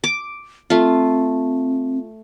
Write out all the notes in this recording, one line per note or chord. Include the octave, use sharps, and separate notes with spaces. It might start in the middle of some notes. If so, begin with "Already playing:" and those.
D6
A3 C4 F4